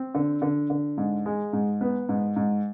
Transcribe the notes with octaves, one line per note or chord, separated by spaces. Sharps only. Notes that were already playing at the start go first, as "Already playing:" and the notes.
Already playing: C4
D3
D3
D3
G#2
G#3
G#2
B3
G#2
G#2